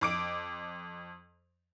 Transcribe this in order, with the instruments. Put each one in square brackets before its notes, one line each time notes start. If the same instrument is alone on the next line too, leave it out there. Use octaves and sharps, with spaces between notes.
[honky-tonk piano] F2 D6 D7